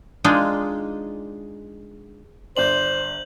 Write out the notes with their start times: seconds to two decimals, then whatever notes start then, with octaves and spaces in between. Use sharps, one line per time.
0.24 G#3 D4 D#4 F4 G#4
2.57 G1 C5 D5 C6 G6 F#7